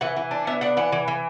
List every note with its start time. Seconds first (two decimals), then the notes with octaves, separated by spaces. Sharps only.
0.01 E3 F#5
0.16 E3
0.31 D4
0.47 B3 E5
0.61 D4 F#5
0.77 E3 F#5
0.92 E3
1.08 E3